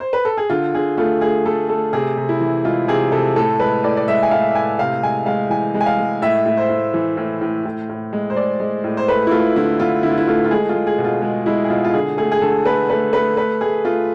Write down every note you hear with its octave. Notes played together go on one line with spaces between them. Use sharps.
C5
B4
A4
G#4
D3 F4
D3 G#4
A3 F4
A3 G#4
A3 A4
A3 A4
C3 G#4
C3
E4
E3
G#3 F4
C3 G#4
C3 A4
A2 A4
G#3 B4
A2 D5
D5
G#3 E5
G#5
A2 F5
A2 G#5
C3 F5
G#3 G#5
G#3 F5
E3 G#5
G#3
G#5
F5
G#3
A2 E5
A2
C5
A2
E3
A2
A2
A2
A2
G#3
C5
G#3 D5
G#3
A2
C5
A3 B4
E4
A3 F4
D3 E4
D3 F4
D3 E4
F4
E4
A3 F4
F4
G#3 G#4
F4
G#3
G#4
B2
F4
G#3
G#3 E4
G#4
B2 F4
F4
D3 G#4
A3 G#4
G#4
D3 A4
A3 B4
A3 B4
A3 B4
A3 B4
A3 G#4
A3 F4